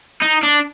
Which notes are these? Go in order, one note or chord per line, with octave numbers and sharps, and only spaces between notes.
D#4
D4